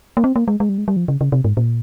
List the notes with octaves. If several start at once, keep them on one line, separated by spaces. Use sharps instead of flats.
A#3
C4
A#3
G#3
G#3
G3
G#3
G3
F3
C#3
C#3
C3
G#2
A#2